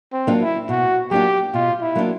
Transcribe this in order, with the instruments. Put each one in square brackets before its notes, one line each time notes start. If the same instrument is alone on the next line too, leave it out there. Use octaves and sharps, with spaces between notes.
[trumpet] C4
[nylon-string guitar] F#3 A#3 D4 F4
[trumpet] E4
[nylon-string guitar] B2 [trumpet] F#4
[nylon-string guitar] F#3 A#3 D4 F4 [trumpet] G4
[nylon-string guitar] B2 [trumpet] F4
[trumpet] E4
[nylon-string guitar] F#3 A#3 D4 F4